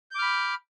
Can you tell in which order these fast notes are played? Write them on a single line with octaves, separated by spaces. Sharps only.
G6 D6 F6 B5